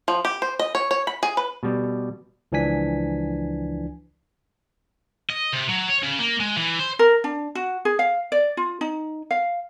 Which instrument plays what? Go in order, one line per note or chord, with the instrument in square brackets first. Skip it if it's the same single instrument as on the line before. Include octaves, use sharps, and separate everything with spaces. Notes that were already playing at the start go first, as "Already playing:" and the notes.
[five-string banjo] F3
G4
C5
D#5
C#5
C#5
B5
G#4
B4
[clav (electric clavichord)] B2 G3
[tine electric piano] C#2 E3 F3 D4 G#5 B6
[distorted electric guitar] D#5
C3
F#3
C#5
C#3
A#3
G#3
E3
C5
[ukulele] A#4
D4
F#4
G#4
F5
D5
F4
D#4
F5